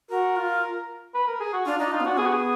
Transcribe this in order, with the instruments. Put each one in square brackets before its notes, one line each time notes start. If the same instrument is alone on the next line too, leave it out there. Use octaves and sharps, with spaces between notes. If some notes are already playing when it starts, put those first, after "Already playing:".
[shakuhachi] F#4 [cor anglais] A#4
[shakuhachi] F4
[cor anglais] B4
A#4
G#4
F#4
[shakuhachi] D4 [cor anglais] F4
[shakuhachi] D4 [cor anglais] D#4
[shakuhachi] D#4 [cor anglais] F4
[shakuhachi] B3
[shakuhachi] D4 [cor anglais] F#4
[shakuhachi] B3 [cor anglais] G#4
[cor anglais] F#4
G#4